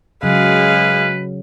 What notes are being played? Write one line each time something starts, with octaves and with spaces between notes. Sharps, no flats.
C#3 F#3 G#3 B4 F5